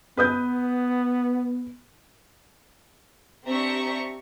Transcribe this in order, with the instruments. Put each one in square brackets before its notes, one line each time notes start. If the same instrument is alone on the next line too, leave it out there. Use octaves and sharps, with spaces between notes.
[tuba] B3 [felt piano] B4 D#6 G6
[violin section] C4 D4 G4 E5 A#5 C#6